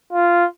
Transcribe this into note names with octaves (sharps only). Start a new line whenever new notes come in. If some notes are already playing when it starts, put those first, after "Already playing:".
F4